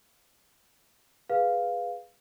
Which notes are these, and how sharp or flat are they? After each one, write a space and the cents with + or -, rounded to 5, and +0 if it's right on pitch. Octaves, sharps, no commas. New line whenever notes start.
G#4 +0 B4 +0 F5 +0